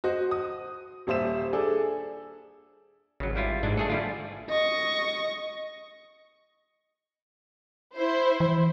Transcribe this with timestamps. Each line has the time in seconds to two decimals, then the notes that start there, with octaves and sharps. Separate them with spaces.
0.04 F#4 C5 D#5
0.31 D#6
1.07 D#1 G3 C5 E5 E7
1.53 D4 G#4 A4
3.20 G#1 C#3 F#3
3.36 G3 E4 F4
3.63 G#2 E3 G#3 D4
3.77 A3 D4 G#4 A4
3.90 D3 G3 E4 F4
4.49 D#5 C#6
7.96 E4 C5
8.40 E3